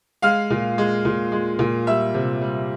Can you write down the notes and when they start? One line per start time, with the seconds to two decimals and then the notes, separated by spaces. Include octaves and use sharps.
0.22 G#3 F5 F6
0.50 A#2
0.78 G#3
1.05 A#2
1.32 G#3
1.59 A#2
1.87 G3 E5 E6
2.14 C3
2.41 G3